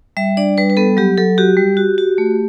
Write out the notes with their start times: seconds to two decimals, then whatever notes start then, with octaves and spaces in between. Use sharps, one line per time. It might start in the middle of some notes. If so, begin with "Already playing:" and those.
0.17 G3 E5
0.37 D4 D5
0.58 G3 B4
0.70 B4
0.77 B3 A4
0.97 F#3 G4
1.17 F#3 A4
1.38 F#4 G4
1.57 G3
1.77 F#4
1.98 F#4
2.18 A3